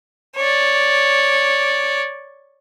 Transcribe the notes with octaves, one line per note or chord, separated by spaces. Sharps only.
C#5 D5